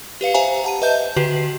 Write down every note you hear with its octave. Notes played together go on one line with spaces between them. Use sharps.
G4 B4 F5 C#7
G4 C5 E5 F5 G#5 A#5
F#5 A5 D#7
B4 D#5 E5 A5 G6
D3 F#4 G4 B4 C7 F#7